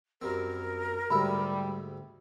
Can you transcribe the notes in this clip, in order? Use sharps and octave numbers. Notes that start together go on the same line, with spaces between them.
F#2 G3 C4 A#4
D2 G#2 G3 E5 B5